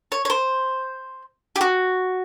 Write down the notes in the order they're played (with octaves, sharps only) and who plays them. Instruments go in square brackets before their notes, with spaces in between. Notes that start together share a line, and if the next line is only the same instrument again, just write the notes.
[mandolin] C#5
C#5
C5
G4
F#4